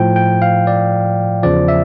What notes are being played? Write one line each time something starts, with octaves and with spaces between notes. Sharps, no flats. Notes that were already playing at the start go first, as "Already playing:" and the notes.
Already playing: A2 F3 G5
G5
F5
D5
E2 C#3 F3 D5
E5